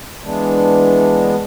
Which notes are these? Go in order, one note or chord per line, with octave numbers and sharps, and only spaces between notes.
E3 G#3 B3 D4